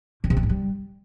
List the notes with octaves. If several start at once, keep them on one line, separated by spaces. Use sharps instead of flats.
D3
C3
G#3
G#2
G3